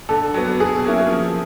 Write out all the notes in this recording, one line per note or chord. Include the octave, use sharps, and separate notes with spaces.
D3 A4
F#3 B3
B2 G#4
F#3 A#3 C#4 E4
F3